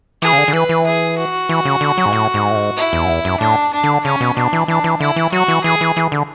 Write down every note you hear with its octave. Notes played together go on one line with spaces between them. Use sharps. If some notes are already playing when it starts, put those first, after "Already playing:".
E3 G#4
C#3
D3
D3
E3 B4
E3
G#4
F#4
E3
C#3
D3
F#3
G#2
A2
G#2
A2
G#2
E4
E2
F#2
E2
F#2
A2 D4
D4
D3
C#3 C#4
B2
B2 D4
E3
E3 D4
E3
D3 E4
E3
F#3 F#4
E3
E3 G#4
E3
E3
D3